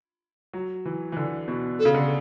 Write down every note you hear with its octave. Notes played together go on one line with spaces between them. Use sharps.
F#3
E3
E3
D3
B2
A4
C#3
D3